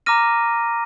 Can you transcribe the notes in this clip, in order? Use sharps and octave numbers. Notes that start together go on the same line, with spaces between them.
A#5 D6 F6 A#6 D#7